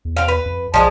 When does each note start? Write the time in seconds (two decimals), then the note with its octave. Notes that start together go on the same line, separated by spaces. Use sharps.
0.05 E2
0.17 C4 F5
0.28 B4
0.46 F2
0.74 A#1 F3 G#3 D4